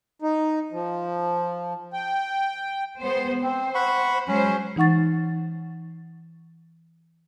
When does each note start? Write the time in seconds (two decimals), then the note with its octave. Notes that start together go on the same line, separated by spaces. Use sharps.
0.22 D#4
0.72 F3
1.93 G5
3.02 G#3 B3 C5
3.43 C4 C5
3.75 F#5 B5 C#6
4.28 F#3 G#3 C#4 C5
4.76 E3 D#4 F#5 C#6 A6